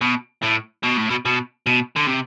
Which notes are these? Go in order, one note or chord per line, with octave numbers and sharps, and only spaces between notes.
B2
A2
B2
A2
B2
B2
B2
D3
C3